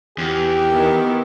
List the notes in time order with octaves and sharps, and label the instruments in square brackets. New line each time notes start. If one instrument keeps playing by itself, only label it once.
[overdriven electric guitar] E2 [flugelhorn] G4
[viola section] D#3 B3 E4